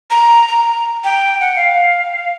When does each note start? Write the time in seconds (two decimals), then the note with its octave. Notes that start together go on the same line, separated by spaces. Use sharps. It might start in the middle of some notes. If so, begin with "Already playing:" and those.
0.11 A#5
0.48 A#5
1.04 G5
1.41 F#5
1.56 F5